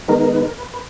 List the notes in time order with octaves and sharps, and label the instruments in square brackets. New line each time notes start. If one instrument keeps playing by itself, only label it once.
[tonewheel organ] D#3 G#3 B3 D#4 A#4
A#4
B4
A#4
B4
B4